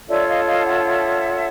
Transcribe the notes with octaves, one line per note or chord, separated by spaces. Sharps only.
D4 F4 A4 C#5 D5 E5
D#5 F5
D#5 F5
E5 F#5
E5 F#5